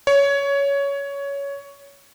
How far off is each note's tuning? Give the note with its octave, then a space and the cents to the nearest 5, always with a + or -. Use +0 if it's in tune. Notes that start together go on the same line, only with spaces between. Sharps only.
C#5 +15